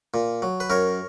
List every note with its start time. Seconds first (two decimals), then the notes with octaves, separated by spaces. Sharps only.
0.14 A#2
0.42 F#3
0.60 B4
0.70 F#2 A#4 C#5